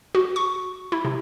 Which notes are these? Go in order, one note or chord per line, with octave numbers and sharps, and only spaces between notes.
F#4
C#6
E4
C3